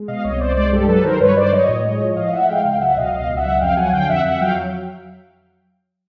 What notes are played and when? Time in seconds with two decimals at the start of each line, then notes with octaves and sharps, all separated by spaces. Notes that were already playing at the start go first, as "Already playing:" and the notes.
Already playing: G#3
0.08 B2 D#5 F5
0.24 C2 C#5 D#5
0.40 C2 C5 D5
0.56 G#3 C5 D5
0.72 G2 G4 A4
0.88 F#3 A4 B4
1.04 D#3 A#4 C5
1.21 G2 B4 C#5
1.37 G2 C5 D5
1.52 F#3 C#5 D#5
1.69 A2
1.85 G#3
2.01 F3
2.17 A2 D#5 F5
2.33 A2 E5 F#5
2.49 G#3 F5 G5
2.65 C#2 F5 G5
2.80 F#3 E5 F#5
2.97 B2 D#5 F5
3.13 C#2 D#5 F5
3.29 C#2
3.37 E5 F#5
3.45 F#3
3.61 F2 F5 G5
3.77 F#3 F#5 G#5
3.93 D3 F5 G5
4.09 F2 E5 F#5
4.25 F2 E5 F#5
4.41 F#3 F5 G5